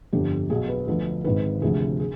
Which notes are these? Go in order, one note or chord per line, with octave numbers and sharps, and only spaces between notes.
G1 F2 D3 G4
B1 B2 G#4
B4
D2 D3 F3 B4
G#1 G#2 D#3 B4
D2 C3 F3 G#4
G#4